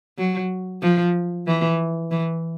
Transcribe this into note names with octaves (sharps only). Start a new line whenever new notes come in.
F#3
F3
E3
E3